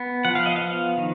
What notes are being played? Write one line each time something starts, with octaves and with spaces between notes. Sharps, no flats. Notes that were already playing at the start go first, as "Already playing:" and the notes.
Already playing: B3
F3 F#5
F5
D#5
F5
B3
D#3